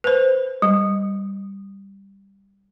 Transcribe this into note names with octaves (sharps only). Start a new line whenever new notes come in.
B4 C5
G3